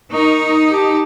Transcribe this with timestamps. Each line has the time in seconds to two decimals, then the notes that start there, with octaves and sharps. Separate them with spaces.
0.13 D#4 A#4 C#6
0.70 G4 A5